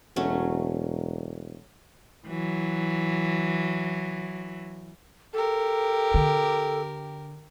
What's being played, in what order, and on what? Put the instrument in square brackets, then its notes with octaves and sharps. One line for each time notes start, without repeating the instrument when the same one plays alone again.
[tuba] E1 [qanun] F#3 A3 C#4
[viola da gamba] E3 F#3
[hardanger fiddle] G4 A#4 [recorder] A4
[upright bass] D3